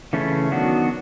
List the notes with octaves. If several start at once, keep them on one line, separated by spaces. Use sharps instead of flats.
C#3 E3 A3 C#4
D#3 F#3 B3 D4 F#4